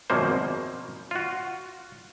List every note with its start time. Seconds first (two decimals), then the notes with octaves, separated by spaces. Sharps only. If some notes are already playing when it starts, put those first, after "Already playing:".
0.10 G#1 F#2 B2 F3 A#3 C5
1.11 F4 F#4